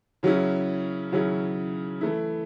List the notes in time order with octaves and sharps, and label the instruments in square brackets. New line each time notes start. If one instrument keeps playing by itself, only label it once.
[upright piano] C#3 F#3 C#4 E4
C#3 F#3 C#4 E4
E3 A3 E4